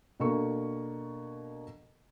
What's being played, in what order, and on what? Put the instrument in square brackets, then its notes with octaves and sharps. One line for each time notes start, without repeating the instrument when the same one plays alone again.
[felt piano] B2 A#3 D4 A4 C#6